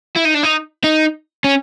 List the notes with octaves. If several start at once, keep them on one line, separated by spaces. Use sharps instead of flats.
E4
D#4
D4
D#4
D#4
C#4